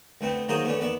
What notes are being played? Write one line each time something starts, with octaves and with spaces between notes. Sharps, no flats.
D2 A3 B3 C4
D#3 F#3 A#3 G#4 C5 D#5
A3 B3 C#4 D4
D#2 B3 D5 E5